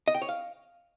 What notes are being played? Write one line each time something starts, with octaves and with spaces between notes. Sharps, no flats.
D#5
G5
C#5
F5